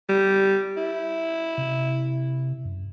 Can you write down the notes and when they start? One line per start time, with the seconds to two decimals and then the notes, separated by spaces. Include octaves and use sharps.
0.09 G3
0.77 E4
1.58 C3
2.65 F#2